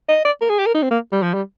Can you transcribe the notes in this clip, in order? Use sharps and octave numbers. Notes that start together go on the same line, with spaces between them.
D#5
D5
A#4
G#4
G4
A#4
D#4
C4
A#3
G3
F3
G3